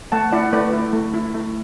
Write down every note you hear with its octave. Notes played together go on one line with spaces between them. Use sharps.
A3 F#5 A5
E4 D5 F#5
A3 B4 D5
E4
A3
E4
A3